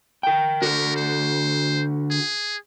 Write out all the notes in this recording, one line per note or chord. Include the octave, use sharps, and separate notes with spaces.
A#4 G5
D3 F#4 A#4
C5
G#4